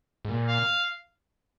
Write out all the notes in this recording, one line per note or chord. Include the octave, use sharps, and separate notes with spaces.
G#2
A#2
F5